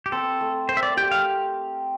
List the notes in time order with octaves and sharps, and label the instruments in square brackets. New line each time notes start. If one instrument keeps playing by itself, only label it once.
[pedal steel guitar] G4
[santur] C4 [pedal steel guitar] A4
[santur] A3
[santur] A#4 [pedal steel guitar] C5
[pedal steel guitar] E5
D5
[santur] G4 [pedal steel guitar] G5
[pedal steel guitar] F5